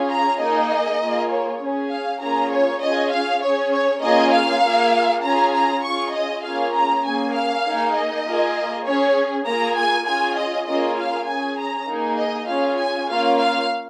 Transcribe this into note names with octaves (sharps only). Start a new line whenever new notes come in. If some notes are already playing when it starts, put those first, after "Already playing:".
Already playing: C#4 F4 G#4
A#5
A#3 D#4 G#4 D#5
A#3 F4 G#4
C#5
C#4 G#4
F5
A#3 C#4 F4 G#4 A#5
C#5
C#4 F4 G#4 D#5
F5
C#4 G#4 C#5
C#5
A#3 C#4 F4 G#4 D#5
F5
A#3 F4 G#4
C#4 F4 G#4 A#5
A#5
C#4 F4 G#4 C#6
D#5
A#3 C#4 F4 G#4 F5
A#5
A#3 C#4 G#4 G#5
F5
A#3 D#4 G#4
D#5
A#3 F4 G#4
C#4 G#4 C#5
A#3 F4 G#4 A#5
G#5
C#4 F4 G#4 G#5
D#5
A#3 C#4 F4 G#4 D#5
F5
C#4 G#4 G#5
A#5
A#3 D#4 G#4
D#5
C#4 F4 G#4 F5
G#5
A#3 C#4 F4 F5
F5